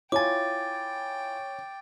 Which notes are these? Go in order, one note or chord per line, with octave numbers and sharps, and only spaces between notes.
E4 F4 C#5 G5 G#5 D6 A6